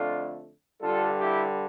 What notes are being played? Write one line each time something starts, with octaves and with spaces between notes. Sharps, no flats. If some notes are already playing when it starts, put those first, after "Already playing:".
Already playing: F2 D3 A3 D4 F4
G2 D3 G3 F4 A4
E4 G4